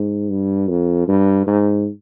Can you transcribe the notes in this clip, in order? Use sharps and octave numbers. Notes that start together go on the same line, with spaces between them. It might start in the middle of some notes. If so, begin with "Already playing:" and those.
Already playing: G#2
G2
F2
G2
G#2